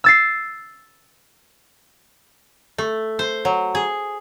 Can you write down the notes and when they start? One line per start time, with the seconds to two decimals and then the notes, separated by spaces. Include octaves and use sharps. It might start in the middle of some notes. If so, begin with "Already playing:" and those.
0.04 E6 A6 C7
2.78 A3
3.19 C5
3.45 F#3
3.75 G#4